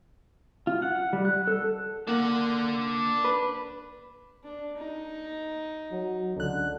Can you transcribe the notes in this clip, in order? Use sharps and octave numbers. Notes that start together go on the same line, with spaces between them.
F4
F#5
G3
F#6
A4
A#3 D4 F#5
B4
D4
D#4
F#3
C#2 D3 F#6